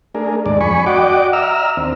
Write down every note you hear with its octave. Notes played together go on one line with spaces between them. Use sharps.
A3 D4 G#4 A#4
D#2 G#2 G#3 D4 D5
F2 G#5 B5 C#6
F#4 D5 D#5 F#5 G5 D6
D#5 E5 A#5 E6 F6
D#2 C4 D4